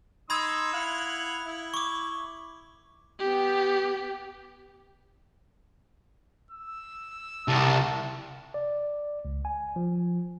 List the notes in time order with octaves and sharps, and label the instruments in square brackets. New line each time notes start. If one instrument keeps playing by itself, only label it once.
[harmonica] D#4 C6 E6 [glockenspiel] B5 D#6 G#6
[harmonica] E4 F5 F#5
E4
[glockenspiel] C#6 D6
[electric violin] B3 G4
[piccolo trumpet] E6
[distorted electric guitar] C2 [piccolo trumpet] A5
[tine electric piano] D5
C#2
G#5
F3